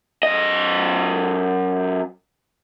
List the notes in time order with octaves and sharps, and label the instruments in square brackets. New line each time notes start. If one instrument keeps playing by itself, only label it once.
[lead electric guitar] F#2 D#5